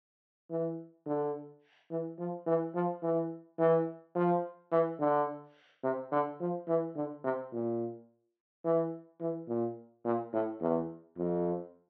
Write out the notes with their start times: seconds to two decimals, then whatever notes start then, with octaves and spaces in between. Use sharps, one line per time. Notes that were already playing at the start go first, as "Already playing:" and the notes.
0.50 E3
1.06 D3
1.90 E3
2.19 F3
2.46 E3
2.75 F3
3.03 E3
3.59 E3
4.15 F3
4.72 E3
5.00 D3
5.84 C3
6.12 D3
6.40 F3
6.68 E3
6.96 D3
7.24 C3
7.52 A#2
8.65 E3
9.21 E3
9.49 A#2
10.05 A#2
10.33 A2
10.61 E2
11.18 F2